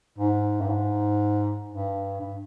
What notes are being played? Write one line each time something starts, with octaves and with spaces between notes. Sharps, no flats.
G#2
G2
G#2
G2
G2